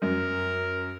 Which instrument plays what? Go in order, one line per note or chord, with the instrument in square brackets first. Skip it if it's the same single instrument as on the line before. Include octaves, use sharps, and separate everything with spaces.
[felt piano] F#2 [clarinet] A#4